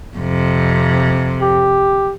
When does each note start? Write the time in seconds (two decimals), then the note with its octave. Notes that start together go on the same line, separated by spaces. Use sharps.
0.17 F2 C3
1.41 G4